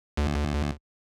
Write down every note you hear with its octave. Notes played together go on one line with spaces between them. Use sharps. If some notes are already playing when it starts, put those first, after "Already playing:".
D2